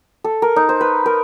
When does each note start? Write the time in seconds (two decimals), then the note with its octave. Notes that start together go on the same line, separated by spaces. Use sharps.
0.24 A4
0.42 A#4
0.56 D#4
0.69 C5
0.81 B4
1.06 A#4